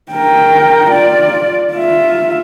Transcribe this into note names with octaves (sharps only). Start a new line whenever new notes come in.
A#4 G5
F4 D5
F4 E5